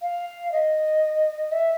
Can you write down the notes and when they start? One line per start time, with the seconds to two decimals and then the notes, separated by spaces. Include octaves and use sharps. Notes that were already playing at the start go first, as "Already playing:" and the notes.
0.02 F5
0.52 D#5
1.52 E5